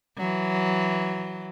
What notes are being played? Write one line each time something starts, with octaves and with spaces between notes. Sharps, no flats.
E3 F#3